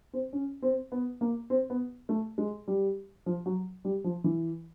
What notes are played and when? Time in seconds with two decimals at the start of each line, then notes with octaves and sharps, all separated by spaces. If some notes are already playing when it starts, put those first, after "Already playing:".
0.13 C4
0.33 C#4
0.62 C4
0.92 B3
1.21 A#3
1.50 C4
1.70 B3
2.09 A3
2.38 G#3
2.68 G3
3.26 F3
3.46 F#3
3.85 G3
4.04 F3
4.24 E3